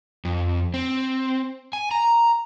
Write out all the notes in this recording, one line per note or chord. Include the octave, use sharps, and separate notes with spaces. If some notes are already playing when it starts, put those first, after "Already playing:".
F2
C4
G#5
A#5